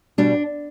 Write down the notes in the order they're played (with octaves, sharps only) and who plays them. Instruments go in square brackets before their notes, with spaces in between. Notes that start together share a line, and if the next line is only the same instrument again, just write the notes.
[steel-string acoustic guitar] B2 G3 D4